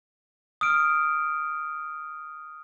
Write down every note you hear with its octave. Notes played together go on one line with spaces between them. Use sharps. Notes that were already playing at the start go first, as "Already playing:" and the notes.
D#6 F6 D7